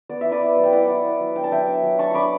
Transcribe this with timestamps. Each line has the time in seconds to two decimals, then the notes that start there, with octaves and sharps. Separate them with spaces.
0.09 B3 D5
0.21 E4 E5
0.32 B4 D5
0.41 B3
0.56 F#3
0.64 G5
0.72 E4 D5 F#5
0.88 E4
1.03 B3
1.20 F#3
1.35 D4 G5
1.44 A5
1.51 F#3 E5 G5
1.68 D4
1.83 F#3
1.98 D4 A5 C#6
2.11 D4 B5 C#6 D6